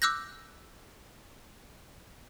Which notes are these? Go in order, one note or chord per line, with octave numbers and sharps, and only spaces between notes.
D6 E6 F#6 G6 A#6